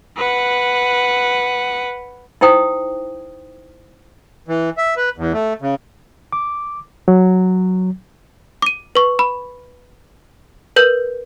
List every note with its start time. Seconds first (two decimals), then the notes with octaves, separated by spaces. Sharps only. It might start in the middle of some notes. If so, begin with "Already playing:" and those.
0.17 B4 F#5
2.41 D#4 E4 C5 G5 D#6
4.48 E3
4.77 E5
4.97 B4
5.17 E2
5.33 A3
5.62 C#3
6.33 D6
7.08 F#3
8.62 D6 D#7
8.95 B4 C#6
9.19 B5
10.76 A#4 B4 G6